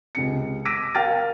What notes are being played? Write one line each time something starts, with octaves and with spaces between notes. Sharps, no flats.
C#2 C3 C#7
D6 E6 A#6 B6 D7 D#7
A#4 F5 G5 F6 A6